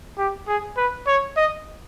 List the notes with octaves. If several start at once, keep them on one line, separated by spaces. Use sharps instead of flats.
G4
G#4
B4
C#5
D#5